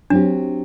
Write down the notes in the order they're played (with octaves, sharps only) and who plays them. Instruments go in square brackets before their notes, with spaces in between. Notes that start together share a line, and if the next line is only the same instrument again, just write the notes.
[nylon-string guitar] F#3 C4 G4 [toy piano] D4